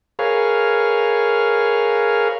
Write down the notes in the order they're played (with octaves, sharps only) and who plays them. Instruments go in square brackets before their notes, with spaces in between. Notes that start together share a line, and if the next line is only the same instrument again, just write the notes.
[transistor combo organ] G#4 A#4 B4 C#5 F5